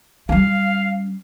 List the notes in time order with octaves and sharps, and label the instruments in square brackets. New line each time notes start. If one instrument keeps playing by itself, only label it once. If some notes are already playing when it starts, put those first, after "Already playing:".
[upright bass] G3 C#4 [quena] F5